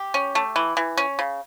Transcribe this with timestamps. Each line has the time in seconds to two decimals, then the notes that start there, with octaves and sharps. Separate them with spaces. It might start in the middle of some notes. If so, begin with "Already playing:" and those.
Already playing: G4
0.14 C#4
0.35 A3
0.56 E3
0.77 E3
0.97 C#4
1.19 C#3